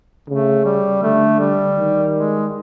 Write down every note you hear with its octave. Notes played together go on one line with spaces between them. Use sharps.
C#3 A3
G3
D3 A3
G3
D#3
G#3